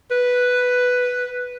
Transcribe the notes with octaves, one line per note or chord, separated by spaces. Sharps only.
B4